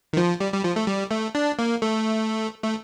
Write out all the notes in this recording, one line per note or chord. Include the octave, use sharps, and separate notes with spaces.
D#3
F3
G3
G3
F3
A3
G3
A3
D4
A#3
A3
A3